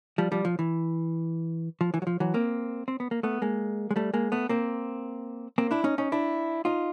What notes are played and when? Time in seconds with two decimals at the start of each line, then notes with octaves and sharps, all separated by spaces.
0.18 F3 G3
0.32 F3 G3
0.45 F3
0.59 E3
1.81 F3
1.94 E3
2.02 F#3
2.07 F3
2.20 E3 F#3
2.34 A#3 C4
2.88 C4
3.00 B3
3.11 A#3
3.23 A3 B3
3.42 G#3 A#3
3.91 G#3
3.96 G3 A3
4.13 G#3 A#3
4.32 A3 B3
4.49 A#3 C4
5.58 A#3 C4
5.71 D4 E4
5.84 C#4 D#4
5.98 C#4 D#4
6.12 D4 E4
6.65 D#4 F4